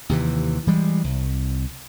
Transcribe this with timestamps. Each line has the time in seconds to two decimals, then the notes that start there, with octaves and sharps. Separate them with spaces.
0.09 D#2 C3 E3
0.67 E3 G3 G#3
1.04 C2